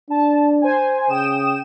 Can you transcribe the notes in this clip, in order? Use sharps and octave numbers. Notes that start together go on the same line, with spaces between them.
D4 A5
C5 G#5
C#3 G5 D#6 E7